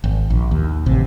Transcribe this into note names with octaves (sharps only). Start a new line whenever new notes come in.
G#1
A#1
D#2
A1 C3